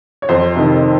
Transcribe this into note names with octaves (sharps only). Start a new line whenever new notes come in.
C#5
F2 C5
C3 D#3